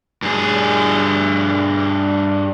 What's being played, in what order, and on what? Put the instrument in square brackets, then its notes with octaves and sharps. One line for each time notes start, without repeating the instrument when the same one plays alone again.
[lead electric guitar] G2 G#4